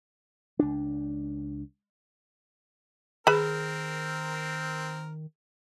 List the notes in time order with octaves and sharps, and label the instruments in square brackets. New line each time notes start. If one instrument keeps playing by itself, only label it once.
[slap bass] C#2 D4
[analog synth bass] D#3 [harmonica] C4 A#4 [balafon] G#4 [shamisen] B4 B5